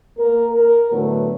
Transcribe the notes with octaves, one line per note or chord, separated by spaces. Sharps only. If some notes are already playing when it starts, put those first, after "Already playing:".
A#3 A#4
A#4
A2 D3 F#3 A3 B3